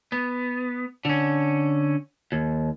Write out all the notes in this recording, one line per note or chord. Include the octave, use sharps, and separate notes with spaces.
B3
D3 C#4
D#2